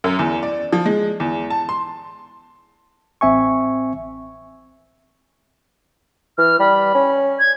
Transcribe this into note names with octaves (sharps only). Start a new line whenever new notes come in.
F#2
E2
D5
F3
G#3
E2
A5
C6
A1 C4 E5 G#5 C#6
E3 F6
G3 B5
C#4
G#6